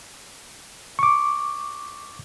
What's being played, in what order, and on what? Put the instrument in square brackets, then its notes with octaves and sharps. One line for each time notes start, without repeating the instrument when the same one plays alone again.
[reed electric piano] C#6 D6